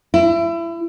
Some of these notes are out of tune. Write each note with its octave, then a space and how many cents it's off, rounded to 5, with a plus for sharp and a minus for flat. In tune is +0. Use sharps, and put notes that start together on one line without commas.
E4 +30